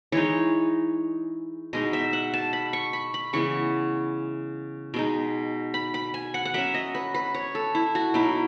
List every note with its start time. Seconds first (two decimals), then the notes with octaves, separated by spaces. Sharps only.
0.12 E3 G#3 D#4 C#5
1.73 B2 G#3 D#4 D#5
1.93 E5
2.13 F#5
2.34 A5
2.53 B5
2.73 C#6
2.93 B5
3.14 B5
3.33 C#3 E3 G#3 B3 C#6
4.94 B2 G#3 D#4
5.74 B5
5.94 B5
6.14 G#5
6.34 F#5
6.45 F#5
6.54 F#3 C#4 E5
6.74 D#5
6.95 B4
7.14 B4
7.34 C#5
7.55 A4
7.75 E4
7.95 F#4
8.14 B2 F#3 B3 D#4 E4